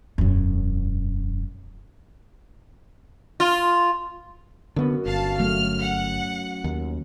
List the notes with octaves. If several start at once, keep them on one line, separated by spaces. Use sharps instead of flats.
E1 F#2
F4
F#2 D3 B3 F#4
G1 F5 A5
F#3 A3 F6
F#5
D#2